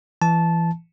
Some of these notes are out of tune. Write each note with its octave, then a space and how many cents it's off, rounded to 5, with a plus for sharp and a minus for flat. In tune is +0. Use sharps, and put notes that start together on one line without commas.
E3 +25 A5 -15